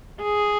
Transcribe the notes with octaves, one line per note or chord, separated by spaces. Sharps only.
G#4